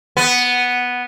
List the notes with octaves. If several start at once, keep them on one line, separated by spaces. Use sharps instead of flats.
B3